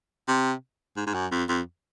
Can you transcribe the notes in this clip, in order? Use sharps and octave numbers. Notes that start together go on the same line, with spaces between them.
C3
G#2
G#2
F#2
F2
F2